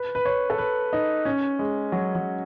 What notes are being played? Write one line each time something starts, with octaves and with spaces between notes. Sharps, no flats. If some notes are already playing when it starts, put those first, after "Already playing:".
Already playing: B4
B4
C#5
A4
B4
D#4
C#4
G#3
F#3
F#3